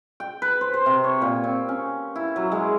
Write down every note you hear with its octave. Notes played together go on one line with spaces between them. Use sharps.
G5
B4
C5
C5
C3
C#5
A#2
C4
C#4
E4
F#3
G#3